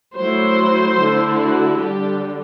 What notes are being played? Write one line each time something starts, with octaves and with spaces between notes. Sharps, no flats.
F#3 A3 E4 C5
D3 A3 E4
F#4
D3 G3 D4 G4